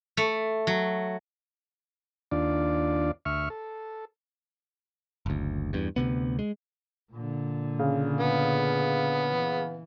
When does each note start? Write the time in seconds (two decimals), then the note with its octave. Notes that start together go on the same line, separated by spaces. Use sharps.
0.17 A3
0.67 F#3
2.32 D#2 D4 F4 D5
3.25 D2 E5 C#6 F6
3.50 A4
5.26 F#1 D2
5.73 E2 G2
5.96 D2 C3 B3
6.39 G#3
7.12 A#2 D3
7.79 C#3
8.20 B3
9.34 E3